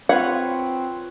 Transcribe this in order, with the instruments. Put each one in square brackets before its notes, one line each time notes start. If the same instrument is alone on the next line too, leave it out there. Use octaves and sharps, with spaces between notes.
[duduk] C4 [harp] F4 B4 C#5 [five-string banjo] F#5